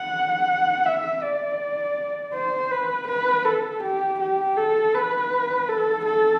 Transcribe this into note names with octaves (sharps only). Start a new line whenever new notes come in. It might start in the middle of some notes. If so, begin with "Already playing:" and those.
Already playing: F#5
E5
D5
C5
B4
B4
A4
G4
G4
A4
B4
A4
A4